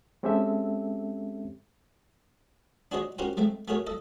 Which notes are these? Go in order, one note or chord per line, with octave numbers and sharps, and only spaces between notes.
G#3 C4 C#4 G4 A4 E5
D4 F#4 G#4 C5 C#5 D#5
C#4 F#4 G4 A#4 C5 G5
G#3 A3 C4 G5
A3 F#4 G#4 A#4 C#5
A4 D#5